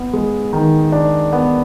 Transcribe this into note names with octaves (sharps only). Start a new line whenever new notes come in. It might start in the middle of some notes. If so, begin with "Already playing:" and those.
Already playing: B3
G#3
D#3
D4
B3